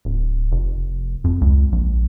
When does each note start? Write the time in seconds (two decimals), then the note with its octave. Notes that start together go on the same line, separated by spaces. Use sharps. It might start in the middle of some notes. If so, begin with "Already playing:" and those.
0.05 D1
0.52 F1
1.24 F2
1.41 C#2
1.72 A#1